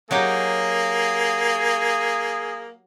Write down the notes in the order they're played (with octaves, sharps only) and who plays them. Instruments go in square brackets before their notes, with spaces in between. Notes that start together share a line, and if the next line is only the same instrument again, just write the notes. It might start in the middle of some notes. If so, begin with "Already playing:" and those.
[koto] F#3 D#4 G4 [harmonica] A#3 [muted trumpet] G#4